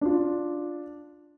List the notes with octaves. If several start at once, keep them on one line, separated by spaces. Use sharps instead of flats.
D4 F4